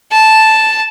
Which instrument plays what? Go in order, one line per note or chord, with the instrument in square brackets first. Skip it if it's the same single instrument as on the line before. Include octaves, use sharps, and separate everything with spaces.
[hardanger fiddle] A5